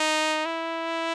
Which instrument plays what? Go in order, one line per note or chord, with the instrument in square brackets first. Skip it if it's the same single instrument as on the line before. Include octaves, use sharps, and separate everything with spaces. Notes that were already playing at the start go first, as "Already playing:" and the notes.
Already playing: [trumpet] D#4
E4